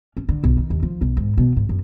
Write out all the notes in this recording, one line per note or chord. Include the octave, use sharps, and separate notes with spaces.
C#4
D3
B1
D#3
D#2
F3
B1
G#2
B2
G#2
F#2